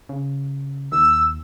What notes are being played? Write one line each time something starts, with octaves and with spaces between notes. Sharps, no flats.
C#3
D#2 E6